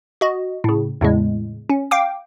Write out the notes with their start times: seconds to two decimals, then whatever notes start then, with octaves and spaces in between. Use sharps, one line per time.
0.21 F#4 D#5
0.64 A2 C#3
1.01 E2 A2 C#3 G#3
1.70 C#4
1.91 F5 G5 D6